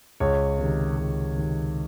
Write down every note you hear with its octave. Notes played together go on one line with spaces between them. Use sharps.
C#2 C#5
C3 D#3
C#2
C3 D#3